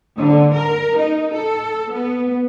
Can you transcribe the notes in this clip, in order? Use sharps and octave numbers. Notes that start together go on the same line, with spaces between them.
D3
A#4
D#4
A4
B3